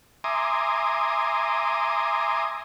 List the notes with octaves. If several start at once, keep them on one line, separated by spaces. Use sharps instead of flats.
E5 G#5 A#5 C6 D6 D#6